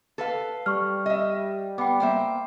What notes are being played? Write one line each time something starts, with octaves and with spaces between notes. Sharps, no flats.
A4 B4 F5
G3 C#6 F6
D#5 E5
B3 G5 B5 D6
A#3 C5 E5